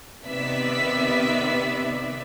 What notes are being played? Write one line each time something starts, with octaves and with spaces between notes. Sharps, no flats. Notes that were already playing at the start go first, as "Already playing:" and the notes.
C3 D#3 B3 B4 D5 E5